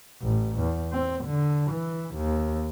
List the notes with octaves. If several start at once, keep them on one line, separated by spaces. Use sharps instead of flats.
A1
E2
C4
D3
E3
D#2